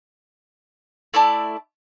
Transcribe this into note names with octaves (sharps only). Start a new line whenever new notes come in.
A3 E4 D5 A5